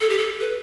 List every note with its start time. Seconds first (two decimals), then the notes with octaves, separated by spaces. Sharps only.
0.01 A4
0.10 G4
0.18 A4
0.41 B4